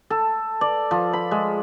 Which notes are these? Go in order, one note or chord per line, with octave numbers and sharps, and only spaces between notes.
A4
D5
F3
B5
G#3